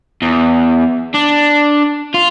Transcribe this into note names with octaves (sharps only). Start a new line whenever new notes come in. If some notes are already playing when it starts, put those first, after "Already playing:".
E2
D4
F4